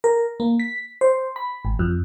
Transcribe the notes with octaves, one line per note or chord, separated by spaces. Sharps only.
A#4
A#3
B6
C5
B5
G#1
F2